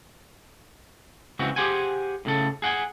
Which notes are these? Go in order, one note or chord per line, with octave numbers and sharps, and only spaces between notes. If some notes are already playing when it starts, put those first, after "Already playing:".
C#2 E3 C4 F#4
G4 G#4 C5 F#5 G#5
A2 C#3 A4
G#4 F#5 G#5